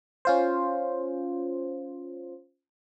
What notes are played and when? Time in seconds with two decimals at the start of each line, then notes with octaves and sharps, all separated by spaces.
0.25 C#4 F4 C5